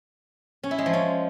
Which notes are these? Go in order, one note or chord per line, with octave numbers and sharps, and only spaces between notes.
C#4
E4
G#3
F3
C#4